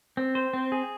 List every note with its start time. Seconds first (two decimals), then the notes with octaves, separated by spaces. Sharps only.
0.17 C4
0.35 C5
0.54 C4
0.72 G#4